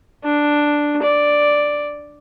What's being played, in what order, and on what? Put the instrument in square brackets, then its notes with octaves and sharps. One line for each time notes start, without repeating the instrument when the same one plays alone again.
[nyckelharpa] D4
D5